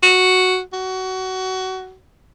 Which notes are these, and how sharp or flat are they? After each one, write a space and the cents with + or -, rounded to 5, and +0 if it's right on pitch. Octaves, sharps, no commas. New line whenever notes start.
F#4 +0
F#4 +20